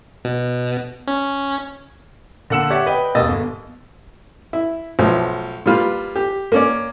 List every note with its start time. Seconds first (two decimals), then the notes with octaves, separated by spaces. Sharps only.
0.25 B2
1.07 C#4
2.50 D3 A#3 F#5 E6 E7
2.70 G4 C#5 D5 E5 F#5
2.86 B4 D#5 G5
3.15 E1 D#2 A#3 D#5 E6 A6
3.28 G1
4.53 E4
4.99 B1 F3 A3
5.66 A#2 G3 F4 B4
6.16 G4
6.52 A#3 C#4 D5